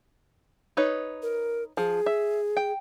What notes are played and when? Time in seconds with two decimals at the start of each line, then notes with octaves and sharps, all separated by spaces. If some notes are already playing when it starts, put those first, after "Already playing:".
0.77 D#4 B4 C#5
1.22 A#4
1.77 F3 G#4
2.06 E5
2.57 G5